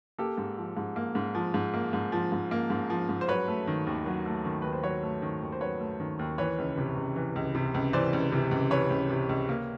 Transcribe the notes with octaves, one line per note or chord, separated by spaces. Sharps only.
A#3 G4 A4
G#2
F3
G#2
A#3
G#2
F3
G#2
A#3
G#2
F3
G#2
A#3
G#2
F3
G#2
C5
F#3 B4 C#5
A3
D#3
D#2
F#3
A3
D#3
D#2 B4
C5
F#3 B4 C#5
A3
D#3
D#2
C5
F#3 B4 C#5
A3
D#3
D#2
E3 B4 C#5
C#2
C3
C#2
E3
C#2
C3
C#2
E3 C5 D5
C#2
C3
C#2
E3 B4 C#5
C#2
C3
C#2
A#3